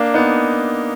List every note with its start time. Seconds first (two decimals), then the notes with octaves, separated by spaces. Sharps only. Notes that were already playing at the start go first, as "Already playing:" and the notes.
Already playing: A#3 D4
0.14 B3 D#4